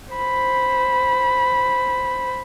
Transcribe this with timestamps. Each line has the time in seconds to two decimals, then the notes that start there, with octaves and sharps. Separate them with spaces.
0.14 C5 B5